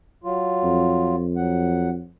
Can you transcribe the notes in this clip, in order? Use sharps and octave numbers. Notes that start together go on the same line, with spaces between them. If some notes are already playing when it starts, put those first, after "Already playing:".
F#3 F4
F2
F#3 F#5